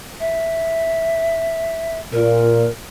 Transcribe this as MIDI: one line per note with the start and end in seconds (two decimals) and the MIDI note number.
0.20 1.99 76
2.12 2.65 46
2.12 2.70 70